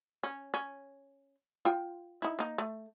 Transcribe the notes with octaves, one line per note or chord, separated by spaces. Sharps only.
C#4
C#4
F4 G5
D#4 E4
A#3 D#4
A3